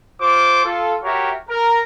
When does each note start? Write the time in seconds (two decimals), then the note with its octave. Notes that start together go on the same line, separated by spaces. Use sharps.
0.21 F4 C5 D6
0.65 F4 A4
1.03 F#4 G4 A#4 C#5 E5
1.49 A#4